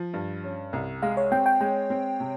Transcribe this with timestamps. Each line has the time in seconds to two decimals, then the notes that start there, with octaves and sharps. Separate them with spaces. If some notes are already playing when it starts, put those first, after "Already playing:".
Already playing: F3
0.14 G2
0.44 C#4
0.73 C2
1.02 G#3 F5
1.17 C#5
1.32 C4 G5
1.46 G5
1.61 G#3 G5
1.90 C4
2.20 C3